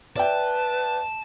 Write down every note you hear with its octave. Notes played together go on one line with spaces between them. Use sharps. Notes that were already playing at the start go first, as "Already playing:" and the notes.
B4 D5 E5 G5 A5